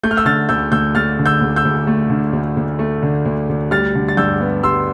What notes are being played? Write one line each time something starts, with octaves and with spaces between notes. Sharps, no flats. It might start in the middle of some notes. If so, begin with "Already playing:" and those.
A3 G6
F6
E6 G6
D3 F6 A6
D2 E6 G6
D2 E6 G6
A3 F6 A6
D3
E6 G6
D2
E6 G6
D2
A3
D3
D2
D2
A3
D3
D2
D2
G3 F6 A6
D3
A6
G2 E6 G6
B3
G3 C6 E6